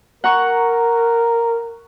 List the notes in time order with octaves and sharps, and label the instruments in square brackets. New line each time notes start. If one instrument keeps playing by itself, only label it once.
[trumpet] A#4 [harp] F#5 A#5 C#6